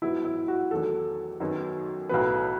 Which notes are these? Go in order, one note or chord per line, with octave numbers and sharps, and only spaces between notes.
G#2 F#3 B3 E4
E4
F#4
E2 D#3 F#3 A3 A4
F#2 D#3 F#3 B3 D#4
B1 A2 F#3 B3 B4